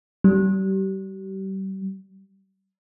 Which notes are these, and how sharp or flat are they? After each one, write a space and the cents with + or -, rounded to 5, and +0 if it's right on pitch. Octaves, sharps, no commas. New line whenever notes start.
G3 -35